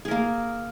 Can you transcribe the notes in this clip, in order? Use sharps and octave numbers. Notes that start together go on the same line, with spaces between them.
A#3 G#4 A#4